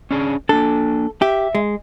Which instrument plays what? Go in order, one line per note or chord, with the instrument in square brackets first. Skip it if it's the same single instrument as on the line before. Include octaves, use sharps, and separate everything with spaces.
[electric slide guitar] C#4 D4 G#4
[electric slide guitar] A#3 D4 [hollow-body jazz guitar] A4
[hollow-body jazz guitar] G4 [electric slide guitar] E5
[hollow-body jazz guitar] G#3